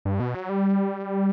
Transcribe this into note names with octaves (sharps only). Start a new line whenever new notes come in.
G2
B2
F#3
G3